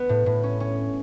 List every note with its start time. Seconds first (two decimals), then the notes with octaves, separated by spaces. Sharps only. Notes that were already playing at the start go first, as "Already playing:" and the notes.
Already playing: B3
0.09 A2
0.26 A2
0.43 C#4
0.60 C#4